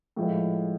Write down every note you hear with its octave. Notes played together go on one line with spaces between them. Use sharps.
A2 F3 G#3